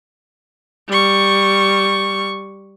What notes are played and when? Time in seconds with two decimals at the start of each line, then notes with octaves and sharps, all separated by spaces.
0.89 G3 C#6